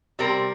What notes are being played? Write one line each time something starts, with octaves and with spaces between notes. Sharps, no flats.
C3 G3 C4 A#4